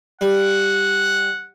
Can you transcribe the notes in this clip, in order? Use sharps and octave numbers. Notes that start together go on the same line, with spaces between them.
G3 F#5